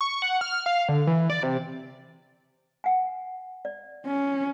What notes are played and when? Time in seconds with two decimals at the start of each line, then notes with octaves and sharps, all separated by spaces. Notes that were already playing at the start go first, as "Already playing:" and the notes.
0.01 C#6
0.22 F#5
0.41 F6
0.66 F5
0.89 D3
1.07 E3
1.30 D5
1.43 C3
2.84 F#5 G#5
3.65 D5
4.06 C#4